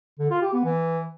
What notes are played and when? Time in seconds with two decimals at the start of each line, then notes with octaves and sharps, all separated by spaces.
0.19 D3
0.30 F4
0.42 G4
0.53 B3
0.64 E3